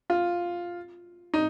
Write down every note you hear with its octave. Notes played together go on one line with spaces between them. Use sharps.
F4
D#4